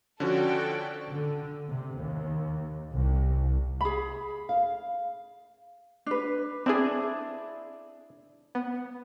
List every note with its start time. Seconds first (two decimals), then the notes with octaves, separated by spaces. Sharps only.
0.20 D3 F3 C#4 F#4 A4 D5 G5
1.11 D3
1.68 C3
1.97 D#2
2.92 C2
3.81 G#4 B5
4.49 F5
6.06 D4 B4
6.66 C4 D4 E4 G#4 D5
8.55 B3